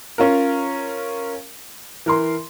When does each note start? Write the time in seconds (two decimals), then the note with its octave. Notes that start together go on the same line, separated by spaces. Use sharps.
0.18 C#4 F4 A#4
2.06 E3 A#4 C6